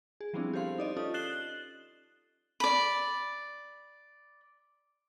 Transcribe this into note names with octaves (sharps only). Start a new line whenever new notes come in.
G#4
F3 G3 B3 C4 D4 E4
G4 A4 C5 F5 C6
D#4 D5 D#5
C#4 F4 A4 D#6
F#6 A6 C7 E7 F#7 G7
D5 B5